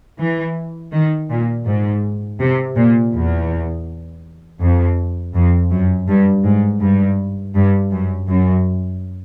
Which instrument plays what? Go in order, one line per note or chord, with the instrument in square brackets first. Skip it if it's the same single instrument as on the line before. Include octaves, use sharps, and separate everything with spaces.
[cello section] E3
D#3
A#2
G#2
C3
A#2
E2
F2
F2
F#2
G2
G#2
G2
G2
F#2
F#2